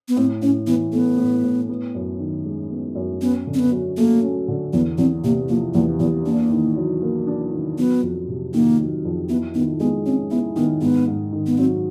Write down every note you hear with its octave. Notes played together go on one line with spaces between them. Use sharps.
B3
A2 C4
A2 C#4
E3 B3
A3 B3
A2
A2
B3
F#2
D#3
G#3
B3
F#2
B3 C#4
D3
C4
B3
F#3
A3 A#3
C#4
D3
E2 B3
E2 C4
C3 A#3
F3 A#3
E2 A#3
E2 B3
A#3 D4
D#3
F#3
A#3
D4
D#3
F#3 B3
F2
C3
D#3 A#3
F#3
F2
B3 E4
D#3 B3
G#3 B3
C4 C#4
B3 E4
D#3 B3
G#2 B3
G#2
D#3
B3
F#3 C4